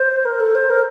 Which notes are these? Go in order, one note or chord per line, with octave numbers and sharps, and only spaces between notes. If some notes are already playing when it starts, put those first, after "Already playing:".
Already playing: C5
A#4
A4
C5
A#4